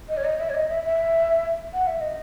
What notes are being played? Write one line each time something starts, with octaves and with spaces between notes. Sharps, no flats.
D#5
C#5
D#5
E5
C#5
D#5
E5
E5
F#5
E5
D#5